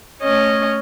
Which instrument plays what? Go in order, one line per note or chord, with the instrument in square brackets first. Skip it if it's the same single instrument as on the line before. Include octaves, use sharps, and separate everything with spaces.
[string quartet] A3 C#4 C#5 D#5